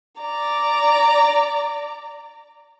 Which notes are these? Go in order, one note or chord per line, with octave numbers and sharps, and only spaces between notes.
D5 A#5